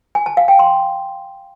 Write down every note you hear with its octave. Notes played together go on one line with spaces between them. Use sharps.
G#5
A5
F5
G5
C6